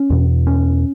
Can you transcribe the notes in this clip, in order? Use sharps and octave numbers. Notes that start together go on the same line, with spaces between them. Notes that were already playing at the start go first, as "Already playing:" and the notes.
Already playing: C#4
E2 B2
C#4